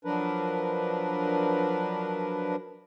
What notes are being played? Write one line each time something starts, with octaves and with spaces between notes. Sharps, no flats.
F3 F#3 D4 A#4 B4